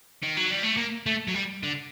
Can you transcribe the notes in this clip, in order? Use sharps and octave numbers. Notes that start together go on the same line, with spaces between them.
D#3
F#3
G3
A3
A#3
A3
F#3
G3
D3